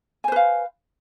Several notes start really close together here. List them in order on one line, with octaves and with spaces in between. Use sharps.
G#5 C5 B4 F5